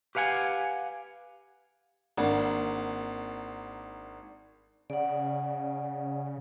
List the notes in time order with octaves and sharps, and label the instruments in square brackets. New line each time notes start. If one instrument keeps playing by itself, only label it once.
[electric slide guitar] G4 B4 F5 F#5 G#5
[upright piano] G#1 A#3 D4 F#5
[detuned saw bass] C#3 [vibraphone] D5 F#5